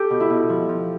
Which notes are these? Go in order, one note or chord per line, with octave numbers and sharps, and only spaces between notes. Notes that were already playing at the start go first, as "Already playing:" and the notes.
Already playing: G4 A4
B2
E4
B2
F3
F3